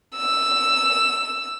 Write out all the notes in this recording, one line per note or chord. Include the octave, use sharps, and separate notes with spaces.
E6